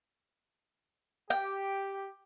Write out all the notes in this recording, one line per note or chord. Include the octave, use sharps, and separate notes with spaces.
G4 G5